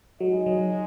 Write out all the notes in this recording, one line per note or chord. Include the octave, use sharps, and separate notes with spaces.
F#3 G#3 D#4 G#4 D#5
F#3